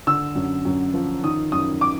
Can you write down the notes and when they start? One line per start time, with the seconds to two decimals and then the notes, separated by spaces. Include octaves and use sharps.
0.07 D3 E6
0.35 F#2
0.65 F#2
0.94 F3
1.24 D#3 D#6
1.52 F#2 D#6
1.81 D6